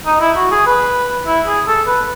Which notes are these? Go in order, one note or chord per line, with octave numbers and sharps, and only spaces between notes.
D#4
E4
F#4
G#4
B4
E4
G#4
A4
B4